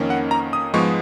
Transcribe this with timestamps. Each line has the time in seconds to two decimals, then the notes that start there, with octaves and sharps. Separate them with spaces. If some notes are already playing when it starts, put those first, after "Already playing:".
Already playing: F2 D#3 A#3 C#4
0.10 F#5
0.31 A#5
0.53 D#6
0.74 G#2 F3 G#3 B3 C#6